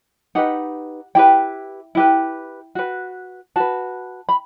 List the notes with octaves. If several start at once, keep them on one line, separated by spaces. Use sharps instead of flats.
D#4 G4 B4 F#5
E4 G4 B4 G5
E4 G4 B4
F#4 B4
F#4 B4 A5
B5